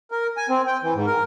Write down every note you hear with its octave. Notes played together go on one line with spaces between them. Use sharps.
A#4
G#5
C4
G5
E3
G#2
A#4